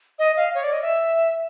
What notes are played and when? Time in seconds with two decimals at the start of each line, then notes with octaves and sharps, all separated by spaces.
0.19 D#5
0.37 F5
0.54 C#5
0.63 D5
0.73 D#5
0.82 E5